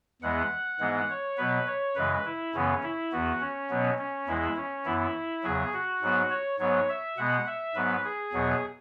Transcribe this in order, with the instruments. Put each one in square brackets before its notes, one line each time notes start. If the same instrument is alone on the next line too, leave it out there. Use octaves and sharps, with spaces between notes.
[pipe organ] E2 E3 G#3 B3 F#5
G#2 E3 G#3 B3
C#5
B2 F#3 B3 B4
C#5
F#2 C#3 E3 G#3 B4
E4
F#2 C#3 E3 B3 C#4
E4
E2 E3 B3 F#4
C#4
B2 F#3 B3
C#4
E2 E3 G#3 E4
C#4
F#2 E3 B3 E4
E2 C#3 F#3 G#4
F#4
G#2 F#3 B3
C#5
G#2 F#3 B3 C#5
E5
B2 G#3 B3 F#5
E5
G#2 F#3 B3 B4
G#4
E2 B2 F#3 B3